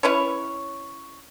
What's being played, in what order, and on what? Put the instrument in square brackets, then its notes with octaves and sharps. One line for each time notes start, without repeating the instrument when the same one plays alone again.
[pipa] C#4 E4 B4 C#5